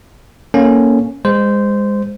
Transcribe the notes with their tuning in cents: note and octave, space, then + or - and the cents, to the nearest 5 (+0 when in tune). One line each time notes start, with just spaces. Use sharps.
A#3 +0 C#4 +0 A4 -5
G#3 -25 C5 -15